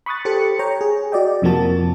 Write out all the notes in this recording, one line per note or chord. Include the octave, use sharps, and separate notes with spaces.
B5 C#6 D#6 F#6 A6
G4 A4 C5 C#7
C#5 G5 A#5
G#4
F#4 D5 D#5 G5
F2 C3 F3 A#3 F#4 A5